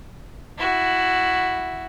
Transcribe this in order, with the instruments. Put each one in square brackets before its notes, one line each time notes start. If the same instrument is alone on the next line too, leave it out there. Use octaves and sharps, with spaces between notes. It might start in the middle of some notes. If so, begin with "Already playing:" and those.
[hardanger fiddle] E4 F#4